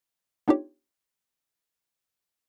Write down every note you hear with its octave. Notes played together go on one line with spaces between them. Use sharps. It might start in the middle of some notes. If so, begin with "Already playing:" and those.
B3 D4 D#4 F4 G4 C#5